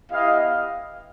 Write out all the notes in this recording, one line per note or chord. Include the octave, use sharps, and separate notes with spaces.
B3 E4 G4 D#5 F5